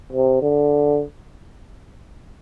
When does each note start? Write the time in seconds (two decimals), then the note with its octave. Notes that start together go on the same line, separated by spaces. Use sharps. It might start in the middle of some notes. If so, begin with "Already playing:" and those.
0.12 C3
0.42 D3